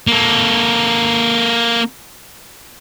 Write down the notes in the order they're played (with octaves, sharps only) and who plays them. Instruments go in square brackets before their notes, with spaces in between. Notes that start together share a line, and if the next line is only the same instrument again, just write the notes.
[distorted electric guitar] A#3 A4